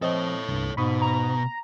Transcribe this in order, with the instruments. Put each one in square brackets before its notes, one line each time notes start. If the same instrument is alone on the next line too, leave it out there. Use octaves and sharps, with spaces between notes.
[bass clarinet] F3 [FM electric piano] C4 D#5 [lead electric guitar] A4 C#5
[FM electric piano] C2 [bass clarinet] G2
[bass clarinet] G#2 [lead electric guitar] B2 [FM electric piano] B5 C#6 D#6
[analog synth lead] A#5